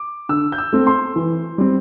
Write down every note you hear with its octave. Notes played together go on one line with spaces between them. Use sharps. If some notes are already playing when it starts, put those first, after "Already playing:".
Already playing: D6
D3 E6
G6
E6
A3 C4
C6
E3
G3 C4